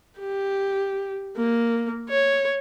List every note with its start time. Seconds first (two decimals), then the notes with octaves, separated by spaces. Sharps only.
0.19 G4
1.37 A#3
2.09 C#5